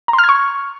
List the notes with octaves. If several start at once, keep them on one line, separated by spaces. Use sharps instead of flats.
A#5
C6
F6
G#6
C#6